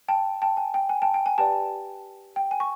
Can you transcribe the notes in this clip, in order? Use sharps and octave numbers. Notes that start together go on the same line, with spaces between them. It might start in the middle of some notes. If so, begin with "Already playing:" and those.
G5 A5
G5 A5
G#5
G5
G#5
G5 A5
G5
G#5
G4 B4 D5 G5 A5
G5
G#5
C#6